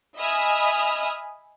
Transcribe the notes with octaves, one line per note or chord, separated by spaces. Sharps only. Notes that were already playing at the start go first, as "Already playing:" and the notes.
D#5 E5 G#5 B5 D#6 F6